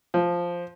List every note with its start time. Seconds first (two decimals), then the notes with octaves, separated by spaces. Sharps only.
0.14 F3